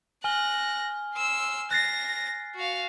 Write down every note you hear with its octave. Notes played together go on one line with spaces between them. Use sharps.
G#5 F6 F#6 A#6 G7
C6 E6
F#6 A6 A#6 C7
F#4 F5